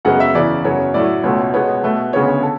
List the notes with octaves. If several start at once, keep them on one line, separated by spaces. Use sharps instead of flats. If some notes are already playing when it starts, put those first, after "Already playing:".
F#2 C#3 G#3 B3 F#5
E5
E2 C#3 E3 D5
F#2 C#3 F#3 B3 C#5
A2 F#3 A3 D5
C#2 B2 A3 C#5
B2 G#3 B3 C#5
B2 A3 B4
D2 C#3 G#3 B3 C#5
A4